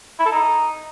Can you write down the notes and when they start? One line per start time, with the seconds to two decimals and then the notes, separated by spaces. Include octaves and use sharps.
0.19 E4
0.25 A4
0.32 D#4